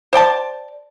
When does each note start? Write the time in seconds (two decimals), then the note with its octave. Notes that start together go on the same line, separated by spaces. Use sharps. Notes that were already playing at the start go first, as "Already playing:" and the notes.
0.13 C5 D5 G5 A5